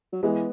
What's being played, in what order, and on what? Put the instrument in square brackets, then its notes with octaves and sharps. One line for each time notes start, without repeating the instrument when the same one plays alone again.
[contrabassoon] F#3
[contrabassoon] E3 [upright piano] G#3 B3